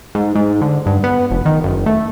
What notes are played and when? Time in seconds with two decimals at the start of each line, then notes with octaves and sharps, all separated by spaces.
0.15 G#2
0.35 G#2
0.61 D3
0.86 G2
1.04 B3
1.31 F1
1.46 D#3
1.64 F#1
1.86 A3